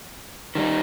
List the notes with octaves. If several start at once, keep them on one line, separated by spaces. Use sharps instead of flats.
D#3 G3 D#4